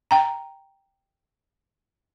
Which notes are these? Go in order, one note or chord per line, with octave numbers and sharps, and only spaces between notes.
G5 A#5